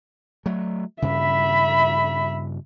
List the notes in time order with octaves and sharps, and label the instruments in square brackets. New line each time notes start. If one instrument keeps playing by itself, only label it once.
[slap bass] F#3 A3
[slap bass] G2 C#3 [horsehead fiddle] E5 B5